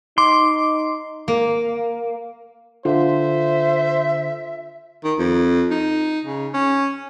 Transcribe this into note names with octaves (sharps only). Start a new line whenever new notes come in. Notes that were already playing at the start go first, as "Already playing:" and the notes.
D#4 C6 D6
A#3
D3 F4 C5 E5
D#3
F2
D#4
C#3
C#4